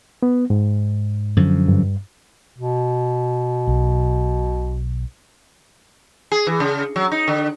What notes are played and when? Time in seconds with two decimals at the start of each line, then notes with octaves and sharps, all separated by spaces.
0.23 B3
0.50 G#2
1.37 F#2 D3 F3
1.68 G2
2.58 B2
3.67 B1
6.32 G#4
6.47 E3
6.60 C#3
6.96 F#3
7.12 D#4
7.28 D3